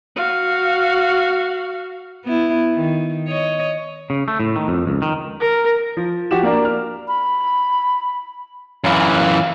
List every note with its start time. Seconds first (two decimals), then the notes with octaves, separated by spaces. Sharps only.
0.16 F#4 F5
2.24 B3 E4
2.74 D#3
3.28 C#5 D#5
4.10 C#3
4.28 A3
4.40 A2
4.56 D#3
4.68 F2
4.87 C#2
5.02 D#3
5.41 A#4
5.97 F3
6.31 F3 F#4 G4 E7
6.43 A#3 D4 A#4
6.65 F6
7.08 B5
8.84 F#2 E3 F5